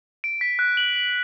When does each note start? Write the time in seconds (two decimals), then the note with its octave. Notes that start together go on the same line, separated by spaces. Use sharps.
0.24 D7
0.41 B6
0.59 F#6
0.77 F#7
0.96 F#7